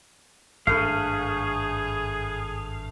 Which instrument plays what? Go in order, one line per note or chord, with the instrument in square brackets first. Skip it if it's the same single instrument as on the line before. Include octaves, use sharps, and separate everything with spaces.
[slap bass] G#1 G2 D4 [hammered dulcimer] A3 B4 [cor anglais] G#4 [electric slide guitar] F5